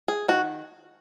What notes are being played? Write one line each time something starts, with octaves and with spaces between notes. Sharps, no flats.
G#4
D#3 F#4